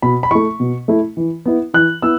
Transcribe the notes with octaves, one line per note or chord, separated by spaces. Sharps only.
B2 B5
B5
A3 E4 C#6
B2
A3 E4
E3
B3 E4
E3 F#6
B3 E4 E6